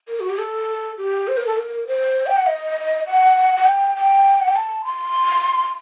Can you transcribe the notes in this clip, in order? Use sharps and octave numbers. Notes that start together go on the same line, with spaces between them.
A#4
F#4
G4
A4
G4
C5
A#4
A4
A#4
C5
G5
F#5
D#5
F#5
F#5
G5
G5
F#5
G5
A5
C6